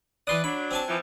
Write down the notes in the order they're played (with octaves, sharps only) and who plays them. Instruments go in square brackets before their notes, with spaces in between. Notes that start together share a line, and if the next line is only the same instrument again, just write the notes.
[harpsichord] E3 C6 D#6 [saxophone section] B4 D5
[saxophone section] F#3 D4 [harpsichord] B5
[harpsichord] C4 G#5 A5
[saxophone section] E3 F3